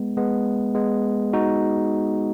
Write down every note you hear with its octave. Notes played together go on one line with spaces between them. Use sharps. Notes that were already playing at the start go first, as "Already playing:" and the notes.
Already playing: G#3 B3
G#3 B3
G#3 B3
D#4 F#4